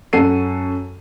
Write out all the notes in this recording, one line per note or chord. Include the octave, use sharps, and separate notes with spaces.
F#2 A4 F#5 C7 D#7